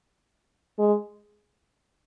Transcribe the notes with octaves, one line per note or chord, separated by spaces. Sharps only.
G#3